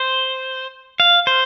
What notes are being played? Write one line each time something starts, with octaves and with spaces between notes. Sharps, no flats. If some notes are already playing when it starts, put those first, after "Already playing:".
Already playing: C5
F5
C5